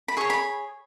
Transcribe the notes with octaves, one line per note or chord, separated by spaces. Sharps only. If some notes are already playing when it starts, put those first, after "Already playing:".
B5
G#4 C#5 C#6
B5